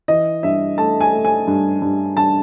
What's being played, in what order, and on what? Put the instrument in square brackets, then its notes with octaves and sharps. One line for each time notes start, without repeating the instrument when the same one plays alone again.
[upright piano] E3 D#5
G2 E5
A3 A5
G#5
A3
G#5
G2
G2
G2 A5